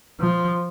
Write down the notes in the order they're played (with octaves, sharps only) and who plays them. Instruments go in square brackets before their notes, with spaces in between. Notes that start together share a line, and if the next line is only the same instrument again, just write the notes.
[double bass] F3